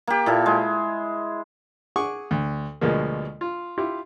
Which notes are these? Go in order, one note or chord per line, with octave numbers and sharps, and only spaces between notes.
A#3 G4
A#2 E4 A4
G#3
G#4 F#5 G#5 C#6 D6
D2
D2 B2 F3 G#3 A#3
F4
E4 F4 G4